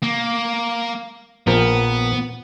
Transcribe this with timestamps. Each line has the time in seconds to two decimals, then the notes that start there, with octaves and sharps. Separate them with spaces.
0.03 A#3
1.47 A#1 F3 B3 A#4